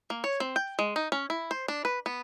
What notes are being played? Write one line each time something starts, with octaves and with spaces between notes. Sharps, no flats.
A#3
C#5
C4
G5
G#3
D#4
C#4
E4
C5
D4
B4
B3